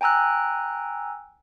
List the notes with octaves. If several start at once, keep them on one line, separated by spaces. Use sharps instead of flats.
G5 G#5 A#5 E6 F#6